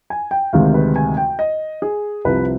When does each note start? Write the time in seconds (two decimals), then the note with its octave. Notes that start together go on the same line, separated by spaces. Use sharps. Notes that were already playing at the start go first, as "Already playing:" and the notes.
0.10 G#5
0.31 G5
0.53 D2 C3 D#3 G#3 F5
0.74 B4
0.96 G#5
1.17 G5
1.39 D#5
1.82 G#4
2.25 C2 C3 F3 B4